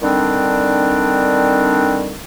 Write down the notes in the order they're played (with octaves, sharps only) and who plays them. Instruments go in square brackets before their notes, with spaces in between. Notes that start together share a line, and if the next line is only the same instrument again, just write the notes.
[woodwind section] D3 D#3 G3 C4 D4